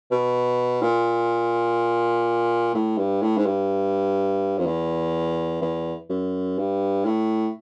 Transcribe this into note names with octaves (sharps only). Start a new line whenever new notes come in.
B2
A#2
A2
G2
A2
G#2
G2
F2
E2
E2
F#2
G2
A2